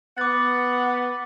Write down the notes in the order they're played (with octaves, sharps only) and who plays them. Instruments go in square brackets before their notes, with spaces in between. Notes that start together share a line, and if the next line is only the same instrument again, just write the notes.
[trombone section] B3 [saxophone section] F#5 [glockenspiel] D6 A6